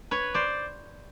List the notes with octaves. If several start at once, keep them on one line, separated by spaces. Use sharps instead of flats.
B4 C#5
C5 D5